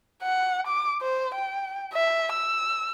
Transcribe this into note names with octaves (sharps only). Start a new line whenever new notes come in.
F#5
D6
C5
G5
E5
E6